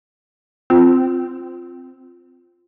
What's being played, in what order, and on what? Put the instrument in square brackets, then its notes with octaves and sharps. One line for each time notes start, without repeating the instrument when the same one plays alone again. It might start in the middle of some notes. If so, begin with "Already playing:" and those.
[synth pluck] C4 [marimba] F4